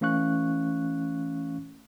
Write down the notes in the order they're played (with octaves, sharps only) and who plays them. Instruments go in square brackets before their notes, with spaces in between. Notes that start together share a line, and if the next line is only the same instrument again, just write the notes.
[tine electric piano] E3 A3 C#4 F5 C#6 F#6